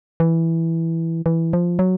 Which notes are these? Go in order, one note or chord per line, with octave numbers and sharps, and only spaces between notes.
E3
E3
F3
F#3